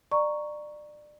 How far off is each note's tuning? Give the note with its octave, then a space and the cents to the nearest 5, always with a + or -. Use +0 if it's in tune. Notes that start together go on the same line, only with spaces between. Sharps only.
D5 +25 A#5 +0 C#6 +0